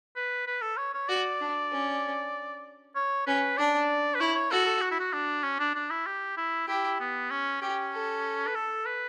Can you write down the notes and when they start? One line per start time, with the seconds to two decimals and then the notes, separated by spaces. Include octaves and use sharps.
0.16 B4
0.47 B4
0.62 A4
0.77 C#5
0.94 C#5
1.08 F#4 D5
1.41 D4
1.72 C#4
2.95 C#5
3.27 C#4 B4
3.58 D4 D5
4.15 B4
4.20 E4 C#5
4.35 C#5
4.51 F#4 A4
4.66 A4
4.82 F#4
4.92 E4
5.00 F#4
5.13 D4
5.44 C#4
5.60 D4
5.75 D4
5.91 E4
6.07 G4
6.37 E4
6.68 E4 G4
7.00 B3
7.31 C#4
7.62 C#4 G4
7.93 A4
8.47 B4
8.55 A4
8.86 B4